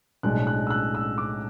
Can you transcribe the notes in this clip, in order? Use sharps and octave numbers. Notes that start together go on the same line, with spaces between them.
B1 A2 G#3 D4 F#6
F#6
E6
F#6
E6
D6